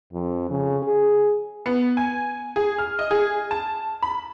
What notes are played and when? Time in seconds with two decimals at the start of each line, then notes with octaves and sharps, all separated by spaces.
0.13 F2
0.50 C#3
0.83 G#4
1.66 B3
1.97 G#5
2.56 G#4
2.78 F6
2.99 D#5
3.11 G#4
3.51 A5
4.03 B5